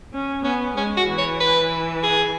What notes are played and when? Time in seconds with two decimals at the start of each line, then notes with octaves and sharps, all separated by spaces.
0.14 C#4
0.44 B3 C#4
0.77 G#3 C#4
0.97 F#4
1.08 E3
1.18 C#5
1.40 B4
2.03 G#4